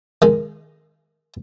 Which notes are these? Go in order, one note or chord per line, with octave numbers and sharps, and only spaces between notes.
D#3 G#3